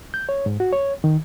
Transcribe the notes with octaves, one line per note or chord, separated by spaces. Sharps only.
G6
C#5
G#2
F#4
C#5
D#3